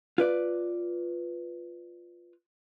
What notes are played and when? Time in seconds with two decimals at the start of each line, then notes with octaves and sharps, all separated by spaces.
0.18 F4 B4 D5